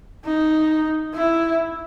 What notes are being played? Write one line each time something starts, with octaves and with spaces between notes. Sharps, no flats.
D#4
E4